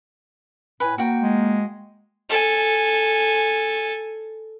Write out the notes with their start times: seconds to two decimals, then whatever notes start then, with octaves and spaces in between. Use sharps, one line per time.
0.80 A2 B4 G#5
0.98 A#3 F#4 G5
1.22 G#3
2.29 A4 G#5